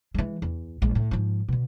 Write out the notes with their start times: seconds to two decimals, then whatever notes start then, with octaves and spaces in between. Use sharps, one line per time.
0.14 E3 G#3
0.42 E2
0.82 A#1 G#3
0.95 A2
1.11 G#2 F3
1.48 B2 D3